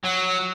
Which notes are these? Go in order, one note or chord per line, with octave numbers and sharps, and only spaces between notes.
F#3